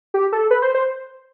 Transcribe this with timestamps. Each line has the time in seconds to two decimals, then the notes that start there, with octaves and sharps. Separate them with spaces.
0.14 G4
0.33 A4
0.51 B4
0.62 C5
0.74 C5